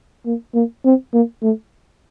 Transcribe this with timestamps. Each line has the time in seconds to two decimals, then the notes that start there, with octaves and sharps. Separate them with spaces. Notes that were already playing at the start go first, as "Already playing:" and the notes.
0.26 A#3
0.55 A#3
0.85 C4
1.14 A#3
1.43 A3